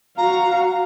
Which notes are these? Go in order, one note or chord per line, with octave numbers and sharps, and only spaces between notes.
F#4 F5 A#5